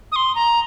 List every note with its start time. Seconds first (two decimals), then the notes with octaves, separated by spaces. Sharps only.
0.12 D#6
0.16 C6
0.35 A#5